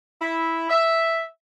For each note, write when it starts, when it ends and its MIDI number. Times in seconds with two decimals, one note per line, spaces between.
0.21 0.70 64
0.70 1.22 76